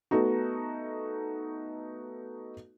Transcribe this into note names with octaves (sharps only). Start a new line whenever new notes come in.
A3 B3 D#4 F#4